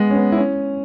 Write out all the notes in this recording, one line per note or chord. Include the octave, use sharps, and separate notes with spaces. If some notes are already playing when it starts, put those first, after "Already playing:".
Already playing: G#3 B3
C#4
B3
E4
C#4